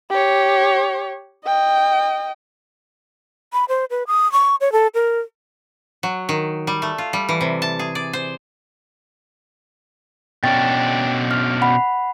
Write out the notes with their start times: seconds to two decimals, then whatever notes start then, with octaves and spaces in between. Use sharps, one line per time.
0.10 G4 C#5
1.45 D#5 G5
3.52 B5
3.69 C5
3.90 B4
4.07 D#6
4.32 C#6
4.61 C#5
4.72 A4
4.94 A#4
6.03 F#3
6.29 D#3
6.67 G3
6.82 A3
6.98 F4
7.13 G3
7.29 E3
7.41 C3
7.62 A5
7.79 G#4
7.95 D5
8.13 C5
10.44 B2 C#4 D4 G5 A6
11.31 F6
11.62 F#5 B5